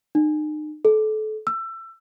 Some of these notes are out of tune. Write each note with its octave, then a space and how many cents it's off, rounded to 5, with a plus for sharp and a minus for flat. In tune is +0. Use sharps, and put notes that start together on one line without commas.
D#4 -40
A4 -30
E6 +25